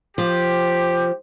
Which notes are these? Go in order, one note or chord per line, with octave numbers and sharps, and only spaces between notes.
F3 G4